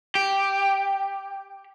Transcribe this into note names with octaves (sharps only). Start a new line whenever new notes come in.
G4